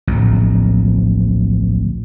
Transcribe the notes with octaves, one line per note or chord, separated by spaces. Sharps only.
D1 A#1